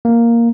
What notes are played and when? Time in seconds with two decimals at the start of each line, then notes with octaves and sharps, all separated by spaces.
0.05 A#3